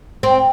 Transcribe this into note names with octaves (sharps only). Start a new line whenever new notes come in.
C4